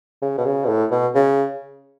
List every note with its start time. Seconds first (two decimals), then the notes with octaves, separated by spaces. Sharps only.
0.22 C#3
0.38 B2
0.45 C#3
0.64 B2
0.69 A2
0.91 B2
1.15 C#3